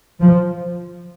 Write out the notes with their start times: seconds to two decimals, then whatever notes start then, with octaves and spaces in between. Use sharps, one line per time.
0.21 F3